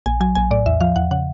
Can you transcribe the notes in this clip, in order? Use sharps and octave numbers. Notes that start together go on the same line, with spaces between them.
A#1 G#5
F#3 G#5
A#1 G#5
A2 D5
E2 E5
F3 F5
E2 F#5
C#3 F#5